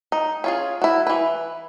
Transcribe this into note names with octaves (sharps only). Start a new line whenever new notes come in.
D#4
C#4 F4 G#4
E4 F#4
E3 B4